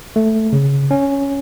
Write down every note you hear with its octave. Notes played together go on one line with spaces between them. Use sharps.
A3
C#3
C#4